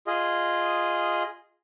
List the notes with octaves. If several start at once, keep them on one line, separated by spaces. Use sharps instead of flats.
F4 G#4 D#5